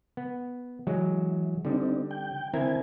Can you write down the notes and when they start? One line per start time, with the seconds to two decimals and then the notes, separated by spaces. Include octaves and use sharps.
0.17 B3
0.87 E3 F#3 G#3
1.65 D3 G3 C4 D4 D#4
2.11 G5
2.53 D3 C4 E4 A#4 G#5